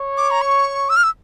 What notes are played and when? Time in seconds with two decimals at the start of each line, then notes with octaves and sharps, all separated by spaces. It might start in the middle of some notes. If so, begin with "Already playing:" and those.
Already playing: C#5
0.17 D6
0.31 A#5
0.42 C#6
0.89 E6
0.97 F6
1.04 E6